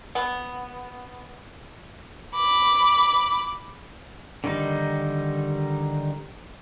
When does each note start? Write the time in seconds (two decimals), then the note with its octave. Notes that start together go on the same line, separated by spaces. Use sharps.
0.15 B3
2.35 B5 D6
4.44 D3 D#3 G3 D#4